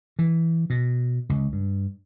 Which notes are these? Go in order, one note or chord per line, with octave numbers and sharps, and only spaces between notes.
E3
B2
C#2
G2